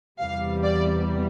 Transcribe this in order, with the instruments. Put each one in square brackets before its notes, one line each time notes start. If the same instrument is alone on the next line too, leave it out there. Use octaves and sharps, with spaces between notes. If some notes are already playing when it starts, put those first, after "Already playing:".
[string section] E2 C3 E3 G3 F5
D5